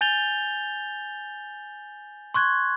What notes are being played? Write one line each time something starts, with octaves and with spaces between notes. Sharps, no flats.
G#5 G6 A6 F7 G7
C6 C#6 F#6 G#6